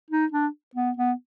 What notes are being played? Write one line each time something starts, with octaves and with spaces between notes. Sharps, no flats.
D#4
D4
B3
B3